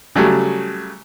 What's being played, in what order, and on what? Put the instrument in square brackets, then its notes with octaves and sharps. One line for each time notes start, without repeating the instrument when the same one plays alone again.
[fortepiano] C#3 F#3 G3 A3